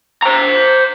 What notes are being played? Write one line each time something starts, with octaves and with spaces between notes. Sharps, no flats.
C5 A#5